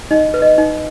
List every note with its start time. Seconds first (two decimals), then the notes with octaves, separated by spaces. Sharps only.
0.11 D#4 D#5
0.34 B4
0.42 D#5
0.58 D#4